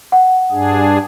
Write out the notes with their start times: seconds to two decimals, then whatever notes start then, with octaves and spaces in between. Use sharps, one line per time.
0.12 F#5
0.52 G2 D4 G#4